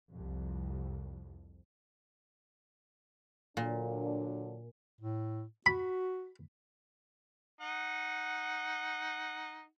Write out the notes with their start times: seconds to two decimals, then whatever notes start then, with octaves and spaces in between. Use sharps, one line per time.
0.12 C2 F2
3.57 A#2 D3 F#3 D4
5.01 A2
5.66 F#4 B5
7.61 D#4 F#5